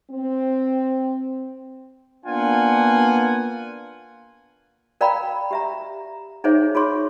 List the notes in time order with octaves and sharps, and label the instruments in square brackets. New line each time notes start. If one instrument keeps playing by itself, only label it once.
[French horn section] C4
[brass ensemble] A#3 B3 D4 F4 F#5 G#5
[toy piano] A#4 D5 F5 G5 A#5 B5
G4 E5 A#5
D#4 G#4 C5 C#5 E5
F4 G#4 C#5 C6 C#6